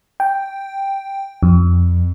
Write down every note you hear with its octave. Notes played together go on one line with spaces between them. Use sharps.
G5
F2